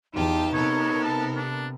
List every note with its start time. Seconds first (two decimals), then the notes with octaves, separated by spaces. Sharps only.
0.14 E2 D#4 F4 G4 A5
0.53 C3 B3 A4 A#4 C#5
1.04 A5
1.36 D4